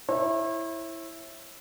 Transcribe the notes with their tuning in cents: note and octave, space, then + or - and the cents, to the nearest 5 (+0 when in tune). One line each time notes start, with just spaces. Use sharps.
E4 +0 C#5 -40